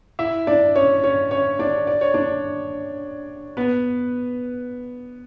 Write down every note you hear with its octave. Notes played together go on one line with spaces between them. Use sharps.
E4 E5
D4 D5
C#4 C#5
C#4 C#5
C#4 C#5
D4 D5
D5
C#5
D4 D5
B3 B4